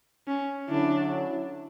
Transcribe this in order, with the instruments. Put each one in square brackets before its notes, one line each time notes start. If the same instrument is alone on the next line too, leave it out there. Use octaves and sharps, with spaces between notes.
[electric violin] C#4
[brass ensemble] D3 F#3 C#4 E4 [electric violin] D4